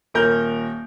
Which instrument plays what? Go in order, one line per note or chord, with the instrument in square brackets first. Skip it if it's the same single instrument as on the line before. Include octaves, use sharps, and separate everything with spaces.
[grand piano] D#1 A#4 G6